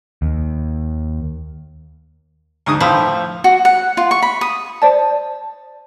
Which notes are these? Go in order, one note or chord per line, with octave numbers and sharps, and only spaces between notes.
D#2
D2 G#2 D#6
F2 A2 F3 B5
F#4
F#5
F4
C#6
B5
D#6
C5 D5 A5